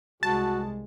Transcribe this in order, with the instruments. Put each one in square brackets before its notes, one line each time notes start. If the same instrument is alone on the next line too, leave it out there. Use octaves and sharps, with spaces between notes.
[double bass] C2 G#3 [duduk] F#4 [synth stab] A5